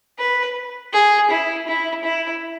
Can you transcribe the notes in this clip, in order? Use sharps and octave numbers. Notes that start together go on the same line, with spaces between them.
B4
G#4
E4
E4
E4